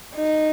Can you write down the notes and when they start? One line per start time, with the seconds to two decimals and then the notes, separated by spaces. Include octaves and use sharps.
0.15 D#4